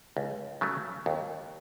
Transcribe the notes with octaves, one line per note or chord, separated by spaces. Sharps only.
C#2
C#3 F#3 A3
D#2